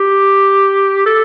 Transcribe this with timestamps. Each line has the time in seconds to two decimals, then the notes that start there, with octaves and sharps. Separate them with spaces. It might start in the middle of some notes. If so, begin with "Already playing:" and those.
Already playing: G4
1.06 A4